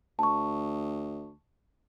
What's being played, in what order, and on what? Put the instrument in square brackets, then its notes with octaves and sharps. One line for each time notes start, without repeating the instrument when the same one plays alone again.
[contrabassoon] D2 [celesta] A5 C#6